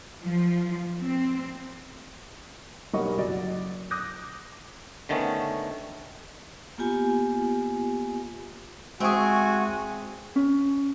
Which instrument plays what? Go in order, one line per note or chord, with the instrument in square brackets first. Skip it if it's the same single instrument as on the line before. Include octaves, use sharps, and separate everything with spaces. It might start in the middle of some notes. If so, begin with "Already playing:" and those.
[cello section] F3
C4
[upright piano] B1 G3 A#3 D#5 F#5 C#6
F#1 F#3 F#4 D5 D#5
D6 D#6 F#6 G6 A#6
[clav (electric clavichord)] D3 D#3 A3 B3 C#4
[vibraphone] A#3 B3 F4 G4 G#5
[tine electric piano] G#3 E5 C#6 [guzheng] C4 G#4 [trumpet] F#4 [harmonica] G#5
[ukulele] C#4